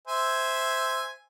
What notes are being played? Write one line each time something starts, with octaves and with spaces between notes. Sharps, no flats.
C5 E5 G#5